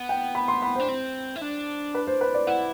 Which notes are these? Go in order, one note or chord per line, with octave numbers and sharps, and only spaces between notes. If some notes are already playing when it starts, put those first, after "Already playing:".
Already playing: B3
G5
B5
C6
B5
D4 C5
C4
E4
D4
B4
C5
B4
D5
E4 F#5